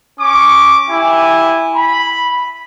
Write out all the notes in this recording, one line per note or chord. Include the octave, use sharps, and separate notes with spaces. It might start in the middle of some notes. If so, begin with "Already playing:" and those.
C#4 C#6 D6
E4 G4 G#5
B5